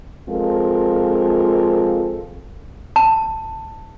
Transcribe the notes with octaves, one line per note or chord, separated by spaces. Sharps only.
F3 G#3 C4 F4 A4 A#4
A5